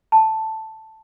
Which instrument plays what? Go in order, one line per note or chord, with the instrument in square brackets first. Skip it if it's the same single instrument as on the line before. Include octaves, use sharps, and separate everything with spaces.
[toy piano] A5